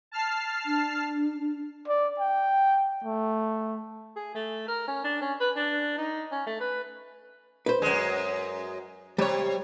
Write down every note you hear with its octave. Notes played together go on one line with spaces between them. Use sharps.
A5 F6 C7
D4
D5
G5
A3
G#4
A3
A#4
C#4
D4
C#4
B4
D4
D#4
C#4
A3
B4
B4 C5
F#2 G#3
C3 G3 C#5